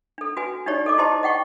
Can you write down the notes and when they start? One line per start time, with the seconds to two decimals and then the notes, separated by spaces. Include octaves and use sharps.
0.18 D4 A4
0.37 F#4 B4 G#5
0.66 D4 D#4 G4 C#5 D5
0.86 A4 D#5 D6
0.98 E4 G4 C5 D#5 A5 C6
1.23 D#5 F#5 G5 C#6